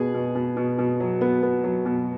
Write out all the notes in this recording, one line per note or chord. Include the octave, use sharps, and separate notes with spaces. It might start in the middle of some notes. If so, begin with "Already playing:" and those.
Already playing: B2 B3 G#4
B2
B2
B2
B2
F#3
B3
B3
F#3
B2